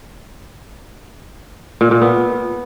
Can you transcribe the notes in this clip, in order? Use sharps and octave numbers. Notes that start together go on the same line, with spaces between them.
A#2
A#2
B3